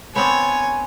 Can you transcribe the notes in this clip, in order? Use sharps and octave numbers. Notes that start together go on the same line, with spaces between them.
B3 C4 D4 C#5 G#5